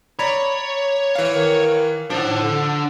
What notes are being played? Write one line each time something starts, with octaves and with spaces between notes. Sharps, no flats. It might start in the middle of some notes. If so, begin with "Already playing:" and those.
C#5 D5 A#5 B5
E3 F5
D#3
A2 F3 D4 F#5
D3